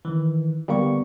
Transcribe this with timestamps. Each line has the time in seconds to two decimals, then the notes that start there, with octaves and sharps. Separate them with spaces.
0.05 D#3 E3
0.68 D3 G3 A#3 B3 C#6